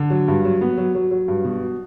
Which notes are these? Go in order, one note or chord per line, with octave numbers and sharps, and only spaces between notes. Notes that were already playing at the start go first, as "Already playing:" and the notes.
Already playing: D3
F#3
G2
F#3
B3
F#3
F#3
F#3
G2
B2